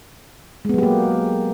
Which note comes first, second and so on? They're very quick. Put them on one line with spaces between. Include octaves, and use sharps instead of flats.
G#3 B3 F#3 G4 A#3